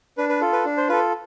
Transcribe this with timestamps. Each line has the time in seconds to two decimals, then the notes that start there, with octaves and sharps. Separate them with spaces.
0.18 D4 B4
0.29 B4
0.41 F4 A4
0.53 B4
0.65 D4
0.77 C5
0.89 F4 A4 B4